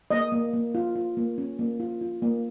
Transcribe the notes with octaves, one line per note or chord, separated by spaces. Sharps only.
A#3 D#5
A#3
A#3
F4
F4
A#3
C#4
A#3
F4
F4
A#3